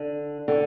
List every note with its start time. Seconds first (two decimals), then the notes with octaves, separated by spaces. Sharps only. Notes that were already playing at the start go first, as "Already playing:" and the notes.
Already playing: D3
0.48 D3